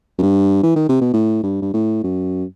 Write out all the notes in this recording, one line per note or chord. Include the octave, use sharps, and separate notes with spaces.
F#2
G2
E3
D#3
C3
B2
A2
G2
G2
A2
F#2